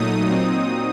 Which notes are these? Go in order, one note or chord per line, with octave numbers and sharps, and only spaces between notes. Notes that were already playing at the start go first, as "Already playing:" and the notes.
Already playing: A#2 F#3 A3 D#4 D#6
A#2 F#3 C4 D#4